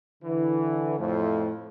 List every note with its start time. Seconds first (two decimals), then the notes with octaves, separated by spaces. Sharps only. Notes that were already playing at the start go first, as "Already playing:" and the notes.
0.23 D3 E3
0.98 F2 A2 F3 A3